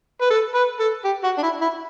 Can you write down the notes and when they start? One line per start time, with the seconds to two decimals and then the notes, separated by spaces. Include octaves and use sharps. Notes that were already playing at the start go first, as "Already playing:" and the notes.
0.21 B4
0.30 A4
0.54 B4
0.79 A4
1.04 G4
1.24 F#4
1.38 D4
1.43 E4
1.61 E4